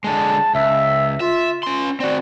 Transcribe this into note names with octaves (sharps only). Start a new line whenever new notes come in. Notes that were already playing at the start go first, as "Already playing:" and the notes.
D3 G#3 A5
C#2 E5
F4 E5
C#4 C6
C4 F#4 D5